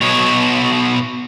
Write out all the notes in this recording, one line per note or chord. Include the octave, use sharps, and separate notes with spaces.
B2 C#5